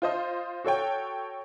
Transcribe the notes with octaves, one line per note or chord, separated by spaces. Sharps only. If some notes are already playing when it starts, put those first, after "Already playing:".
F4 C5 D#5
F#4 A4 C#5 G5